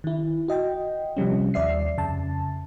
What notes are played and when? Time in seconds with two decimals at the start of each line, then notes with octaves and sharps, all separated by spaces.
0.04 D#3 E4
0.48 F#4 D#5 G5
1.17 C3 F3 G3 C#4
1.54 D#2 D5 E5 C7
1.97 F2 C#3 A5